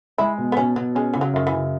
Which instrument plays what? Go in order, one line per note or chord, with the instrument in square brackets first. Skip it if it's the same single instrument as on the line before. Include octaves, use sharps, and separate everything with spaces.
[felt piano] G#3 [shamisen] E4
[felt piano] B2
[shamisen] B3
[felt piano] B2 [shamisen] C#4
[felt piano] B2 [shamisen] F#3
[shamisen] G#3 [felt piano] C#4
[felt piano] C#3 [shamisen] E3
[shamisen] F#3
[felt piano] F#2 [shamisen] D#3
[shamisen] E3
[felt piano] C#3